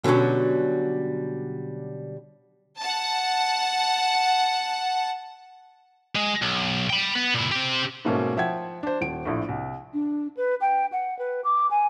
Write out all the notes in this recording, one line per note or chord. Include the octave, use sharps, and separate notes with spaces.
B2 D3 F#3 G3 C#4
F#5 A5
G#3
B1
G5 B5
B3
A#2 E4
C4 G4
G#2 B2 A3 A#3 C#4 D#4
F3 E5 F#5 G5 G#6
D4 C5
D#1 D7
A#1 A2
C2
D4
B4
G5
F#5
B4
D6
G#5